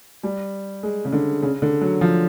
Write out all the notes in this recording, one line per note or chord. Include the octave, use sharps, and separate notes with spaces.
G3
G#3
C#3
D3
C#3
D3
F#3
F3